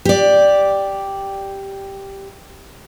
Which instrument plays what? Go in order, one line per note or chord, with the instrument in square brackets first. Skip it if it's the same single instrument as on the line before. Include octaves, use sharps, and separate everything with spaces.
[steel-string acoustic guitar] G4 D5